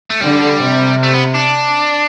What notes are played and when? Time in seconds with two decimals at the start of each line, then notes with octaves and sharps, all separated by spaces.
0.10 A3
0.21 D3 G3
0.62 C3
1.03 A3
1.13 B3
1.34 D4